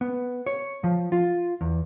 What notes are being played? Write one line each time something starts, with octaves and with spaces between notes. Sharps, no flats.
B3
C#5
F3
F4
E2